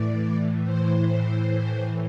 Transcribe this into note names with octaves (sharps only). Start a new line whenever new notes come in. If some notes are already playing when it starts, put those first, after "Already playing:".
Already playing: A2 E3 D5
C5